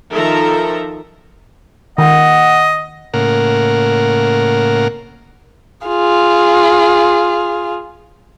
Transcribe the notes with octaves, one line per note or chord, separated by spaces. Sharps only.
D#3 F3 A4 A#4 E5 A#5
D#3 D#5 F#5
A2 C#3 A#3 A#4 F#5
F4 G#4